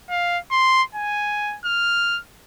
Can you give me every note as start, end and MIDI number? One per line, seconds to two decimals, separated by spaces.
0.10 0.38 77
0.52 0.83 84
0.95 1.57 80
1.65 2.20 89